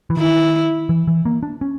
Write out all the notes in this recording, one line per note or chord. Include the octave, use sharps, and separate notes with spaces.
E3
D#3 E4
E3
E3
A#3
D4
C#4